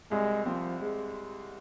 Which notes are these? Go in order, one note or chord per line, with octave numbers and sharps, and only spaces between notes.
C2 G#3
F3 C4
G#3